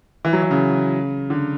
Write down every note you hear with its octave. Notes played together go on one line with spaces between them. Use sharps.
E3
F#3
E3
C#3
D3